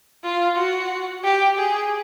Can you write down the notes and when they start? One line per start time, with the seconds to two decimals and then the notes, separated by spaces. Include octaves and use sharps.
0.24 F4
0.57 F#4
1.24 G4
1.58 G#4